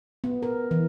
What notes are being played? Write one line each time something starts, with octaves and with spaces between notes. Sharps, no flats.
B3
A#4
E3